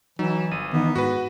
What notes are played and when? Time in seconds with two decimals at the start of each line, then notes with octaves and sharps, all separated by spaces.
0.19 E3 F#3 D#4 E7
0.51 G1 D#7
0.73 D#3 E3 B3 D#4
0.95 G#2 F#4 B4